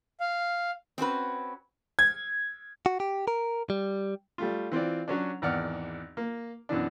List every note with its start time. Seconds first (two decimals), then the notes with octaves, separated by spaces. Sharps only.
0.20 F5
0.98 C4 C#4 F#4 B4
1.99 G#6
2.86 F#4
3.00 G4
3.28 A#4
3.70 G3
4.38 G3 A3 F4
4.72 E3 C4 F4 D5
5.08 F#3 C#4 D4
5.42 G#1 E2 D5 F#5 F6
6.17 A#3
6.69 F#2 B2 E3 D4